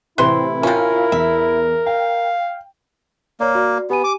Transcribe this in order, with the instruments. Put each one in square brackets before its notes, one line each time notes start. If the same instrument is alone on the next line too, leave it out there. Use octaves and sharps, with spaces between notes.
[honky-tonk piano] A2 C3 E3 [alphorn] C4 [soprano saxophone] E4 [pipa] B4 C6
[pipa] C3 C#4 [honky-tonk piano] F4 F5 [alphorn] A#4
[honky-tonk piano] E2 [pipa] E5
[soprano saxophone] F5 [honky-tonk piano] G5
[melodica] A#3 [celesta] C#5 D5
[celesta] F#4 D5
[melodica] B3 [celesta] G4 G#5 D#7
[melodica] D6